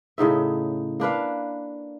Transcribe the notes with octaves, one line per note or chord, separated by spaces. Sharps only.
A2 C#3 D#4 E5
A#3 D4 B4 F5